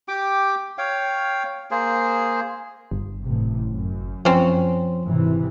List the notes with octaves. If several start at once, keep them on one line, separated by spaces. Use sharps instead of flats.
G4 G5 D6
C#5 F5 G5
A#3 G#4 C5
G1
A1 C3
F#2
F3 C4 C#4
G#1 C3 E3